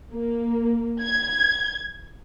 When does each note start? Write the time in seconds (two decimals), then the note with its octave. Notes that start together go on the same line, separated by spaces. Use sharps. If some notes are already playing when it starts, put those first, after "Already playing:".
0.12 A#3
1.02 G#6